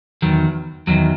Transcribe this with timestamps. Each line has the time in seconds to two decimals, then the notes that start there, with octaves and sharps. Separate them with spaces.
0.22 E2 D#3 F#3
0.87 E2 D#3 F#3